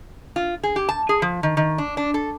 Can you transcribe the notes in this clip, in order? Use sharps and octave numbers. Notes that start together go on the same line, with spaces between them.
F4
G#4
G4
A5
G#4
F3
D#3
D#3
D4
D4
A4